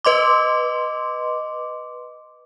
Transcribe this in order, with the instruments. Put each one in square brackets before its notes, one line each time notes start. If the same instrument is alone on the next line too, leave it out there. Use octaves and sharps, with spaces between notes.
[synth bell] B4 D#5 C6 D6